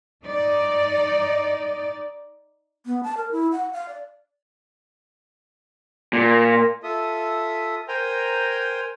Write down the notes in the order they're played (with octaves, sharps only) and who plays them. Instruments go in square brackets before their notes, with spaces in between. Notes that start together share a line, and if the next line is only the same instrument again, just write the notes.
[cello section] D#4 D5
[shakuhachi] B3
A5
A#4
E4
F#5
F5
D5
[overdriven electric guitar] A#2
[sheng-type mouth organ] F4 A4 E5 D#6
A#4 C5 G5 G#5 A#5